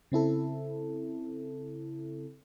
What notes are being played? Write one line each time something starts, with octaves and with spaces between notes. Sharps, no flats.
C#3 C4 E4 A4